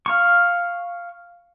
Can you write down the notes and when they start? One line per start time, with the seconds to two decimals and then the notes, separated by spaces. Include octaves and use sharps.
0.06 F5 C#6